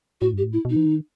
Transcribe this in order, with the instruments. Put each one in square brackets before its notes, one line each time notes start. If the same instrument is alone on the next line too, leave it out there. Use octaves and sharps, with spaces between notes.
[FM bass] A2 [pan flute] F#4
[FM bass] G2 [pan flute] G4
[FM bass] A2
[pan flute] E4
[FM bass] B2 [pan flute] D#4
[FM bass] E3
D#3